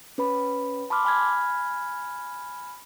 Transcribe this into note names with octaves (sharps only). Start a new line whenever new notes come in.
C#4 B4 B5
A5 B5 C6 D6 F6
G#5 B5 F6 G#6